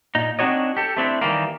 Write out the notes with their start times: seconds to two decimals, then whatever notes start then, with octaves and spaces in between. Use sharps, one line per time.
0.15 A#2 D#4
0.39 C4 D4 D#4 F#4 C#5 D#5
0.77 G4 A4
0.97 A3 C4 D4 E4
1.21 D#3 E3 G3 A#3